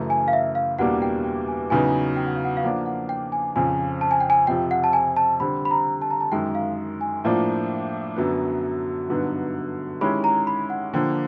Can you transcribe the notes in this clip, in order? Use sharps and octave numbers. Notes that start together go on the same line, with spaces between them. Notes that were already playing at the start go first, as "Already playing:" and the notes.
Already playing: F#2 C#3 E3 A3
G#5
F5
E5
F5
E2 B2 G3 A#3 D4 F#5
G5
G5
G#5
E2 C#3 F#3 B3 D#4 G#5
G5
F#5
F5
F#5
F5
F3 A#3 D4 F4 F#5
F#5
G5
G#5
F2 C#3 F3 G#5
A5
G#5
G5
G#5
F2 C3 F3 G5
F#5
A5
G#5
A5
D3 G3 C4 B5
B5
A#5
A5
A#5
A5
F#2 D#3 G#3 G5
F5
G#5
A2 F3 A#3 D4 F4 A5
F#2 D3 F#3 B3
G2 D3 F#3 B3 D#4
D#3 G#3 C#4 E4 G4 B5
A#5
B5
F#5
D3 F3 A#3 G5